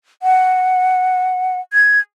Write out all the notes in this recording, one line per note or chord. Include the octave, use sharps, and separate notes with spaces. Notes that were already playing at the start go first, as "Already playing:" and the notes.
F#5
G#6